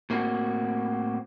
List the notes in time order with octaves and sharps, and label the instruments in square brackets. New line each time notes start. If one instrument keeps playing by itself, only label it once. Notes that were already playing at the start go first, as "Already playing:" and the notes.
[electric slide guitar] A2 A#3 C4 D4 F#4